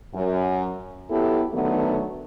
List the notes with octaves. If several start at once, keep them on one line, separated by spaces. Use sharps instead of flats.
F#2
F#3 B3 E4 G4 A4
D3 D#3 F#3 A3 B3